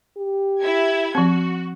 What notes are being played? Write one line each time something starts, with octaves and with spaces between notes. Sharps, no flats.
G4
E4 G#6
F3 C4 F#4